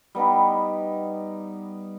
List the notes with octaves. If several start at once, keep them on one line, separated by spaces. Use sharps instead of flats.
G3 B3 D#4 G4